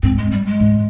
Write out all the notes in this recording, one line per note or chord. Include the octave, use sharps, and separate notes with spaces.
G#2 C4
G#3
G3
G#3
G#2